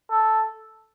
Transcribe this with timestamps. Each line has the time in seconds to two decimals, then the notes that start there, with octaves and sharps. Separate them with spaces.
0.11 A4